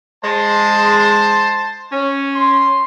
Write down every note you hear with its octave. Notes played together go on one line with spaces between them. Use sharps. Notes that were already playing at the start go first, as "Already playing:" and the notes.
G#3 C5 A5
C#4
C6